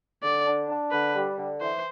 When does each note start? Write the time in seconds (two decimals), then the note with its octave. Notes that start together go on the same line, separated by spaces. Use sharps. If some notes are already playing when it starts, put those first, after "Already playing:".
0.23 D3 D5
0.46 D4
0.69 D4
0.91 D3 B4
1.15 G3
1.37 D3
1.61 E3 C5